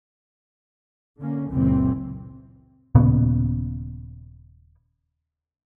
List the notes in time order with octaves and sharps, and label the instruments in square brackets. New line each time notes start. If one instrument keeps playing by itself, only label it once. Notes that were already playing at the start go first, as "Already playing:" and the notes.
[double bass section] D3 A#3 C#4
F#1 C#2 A#2 E3 C4
[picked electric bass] D#1 A#2 C#3 B3